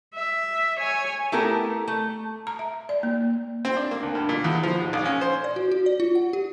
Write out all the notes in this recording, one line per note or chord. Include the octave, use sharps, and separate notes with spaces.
E5
C#5 G#5
A3 B3 E4 G4 A4 A#4
A3
A#5
E5
D5
A#3
C4
D4
A#3
D2
G2
A#2
E2
F3
G#2
A#1
C#4
C5
D5
F#4
F#4
D5
F4
F#5
G4